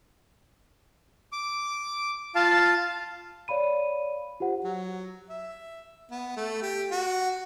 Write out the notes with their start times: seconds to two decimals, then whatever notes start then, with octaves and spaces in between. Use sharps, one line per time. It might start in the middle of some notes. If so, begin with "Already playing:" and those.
1.33 D6
2.35 F4 F5 A5
3.48 C#5 D5 F5 B5 D#7
4.40 F4 G4 C5 F#5
4.64 F#3
5.30 E5
6.11 B3
6.36 A3
6.62 G4
6.91 F#4